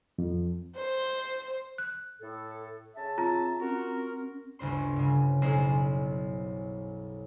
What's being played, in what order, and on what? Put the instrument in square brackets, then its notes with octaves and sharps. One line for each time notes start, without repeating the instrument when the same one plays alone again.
[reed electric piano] F2
[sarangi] C5
[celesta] F#6
[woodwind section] A2 A4
C#3 E5 A5
[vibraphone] C4 [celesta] F4 A#5
[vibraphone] C4 C#4 [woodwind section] F#4 A#4
[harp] G1 D2 C#3 C5 C6
G2 C#3
F#1 B1 G#4 C5